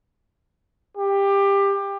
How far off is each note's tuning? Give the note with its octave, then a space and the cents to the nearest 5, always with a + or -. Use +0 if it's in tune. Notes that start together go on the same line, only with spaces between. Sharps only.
G4 +20